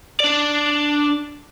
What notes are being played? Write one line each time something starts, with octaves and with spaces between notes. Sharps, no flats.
D4 D5